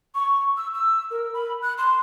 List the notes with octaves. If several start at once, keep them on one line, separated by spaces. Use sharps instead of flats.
C#6
E6
E6
A#4
B5
F#6
C6